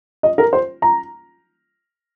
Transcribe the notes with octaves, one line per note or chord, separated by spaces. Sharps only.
D#5
A#4
C5
A#5